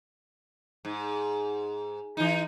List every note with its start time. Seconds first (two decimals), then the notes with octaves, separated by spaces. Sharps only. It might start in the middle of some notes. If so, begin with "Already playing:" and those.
0.85 G#2
2.17 E3 D#4